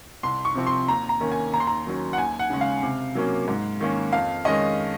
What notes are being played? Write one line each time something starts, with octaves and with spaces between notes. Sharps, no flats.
C2 C6
C#6
C3 F3 C4
C6
D#2 A#5
A#5
D#3 A#3 C#4
G#5
D#2 A#5
C6
A#5
D#3 F#3 C#4
F#5
D#2 G#5
F#5
C#3 G#3 C#4
F5
C3
F#3 A#3 C#4
G#2
D#3 A#3 C#4
F2 F5
D#3 G#3 C#4 D#5